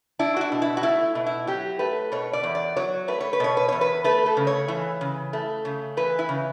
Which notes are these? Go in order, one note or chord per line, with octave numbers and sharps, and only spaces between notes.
D4 E4
F#4
E4
B2
E4
F#4
A3 E4
B2
E4
F#3 G4
A3 B4
B2 C#5
D5
E2
D5
F#3 C#5
A3 B4
C#5
B4
B2 C#5
B4
E2 C#5
B4
A3 B4
A4
C#3
C#5
E3
C#3
A3
C#3
E3 B4
E4
C#3